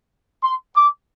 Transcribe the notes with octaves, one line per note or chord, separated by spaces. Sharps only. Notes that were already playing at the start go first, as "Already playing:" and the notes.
C6
D6